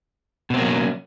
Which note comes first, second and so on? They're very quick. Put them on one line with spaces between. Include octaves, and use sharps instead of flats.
B2 C4 A#3 F#3 C#4